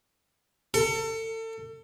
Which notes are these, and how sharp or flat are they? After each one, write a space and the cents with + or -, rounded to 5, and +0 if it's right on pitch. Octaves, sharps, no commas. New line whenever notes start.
A4 +35